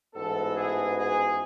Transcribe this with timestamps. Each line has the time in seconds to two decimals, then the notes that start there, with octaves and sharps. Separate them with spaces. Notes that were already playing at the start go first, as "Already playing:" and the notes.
0.15 A1 G#2 E3 B3 F#4 A4
0.55 G#4
0.96 G#4